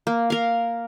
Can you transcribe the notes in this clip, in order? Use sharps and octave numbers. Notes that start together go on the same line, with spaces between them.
A#3
A#4 F5